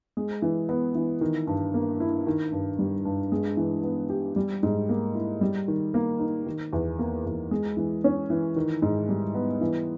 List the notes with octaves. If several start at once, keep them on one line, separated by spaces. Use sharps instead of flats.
G#3
E3
B3
E3
D#3
G2
A#3
E4
D#3
G2
G3
G2
G#3
E3
B3
G4
G3
G#2
A#3
E4
G3
D#3
A#3
D#4
D#3
E2
A#3
E2
G#3
E3
C#4
E3
D#3
G#2
G3
B3
E3